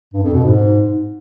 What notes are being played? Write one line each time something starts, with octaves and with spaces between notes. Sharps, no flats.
G2
F2
B2
G#2